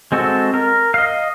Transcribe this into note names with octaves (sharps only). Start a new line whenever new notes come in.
G#3 C4 F#4 A4
A#4
D#5 F5